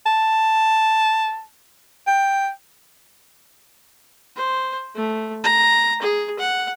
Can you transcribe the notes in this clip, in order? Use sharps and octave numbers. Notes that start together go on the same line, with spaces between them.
A5
G5
C5
A3
A#5
G#4
F#5